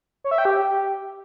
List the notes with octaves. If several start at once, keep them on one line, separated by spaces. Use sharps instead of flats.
C#5
E5
G5
G4